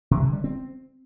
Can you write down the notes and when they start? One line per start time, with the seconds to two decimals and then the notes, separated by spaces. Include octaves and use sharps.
0.11 C3
0.22 D3
0.33 G3
0.44 C4